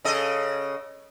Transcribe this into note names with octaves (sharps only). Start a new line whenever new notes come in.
C#3 A4 D#5